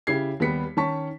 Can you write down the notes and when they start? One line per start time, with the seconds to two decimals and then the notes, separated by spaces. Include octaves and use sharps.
0.07 C#3 E4 G4 G#6 C7
0.40 D#2 G3 B3 B6 C#7
0.77 D#3 C#4 A5 C#6 B6